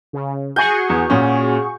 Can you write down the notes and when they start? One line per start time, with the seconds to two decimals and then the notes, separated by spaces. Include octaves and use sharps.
0.13 C#3
0.56 F#4 G#4 G#5 C#6 G6
0.90 E2
1.10 A#2 C#4